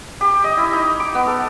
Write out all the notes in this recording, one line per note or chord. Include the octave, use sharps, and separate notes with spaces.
G4
D#5
E4
D#4
D6
B3
A4